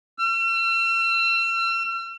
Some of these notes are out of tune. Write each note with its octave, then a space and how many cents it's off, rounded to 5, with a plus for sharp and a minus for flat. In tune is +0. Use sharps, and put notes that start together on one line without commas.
E6 +45